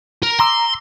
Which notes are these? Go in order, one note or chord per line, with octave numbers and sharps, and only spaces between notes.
A#4
A#5 C6 D6 E6